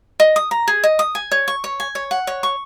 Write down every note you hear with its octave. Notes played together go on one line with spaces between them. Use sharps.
D#5
D#6
A#5
G#4
D#5
D#6
G#5
C#5
C#6
C#5
G#5
C#5
F#5
C#5
C#6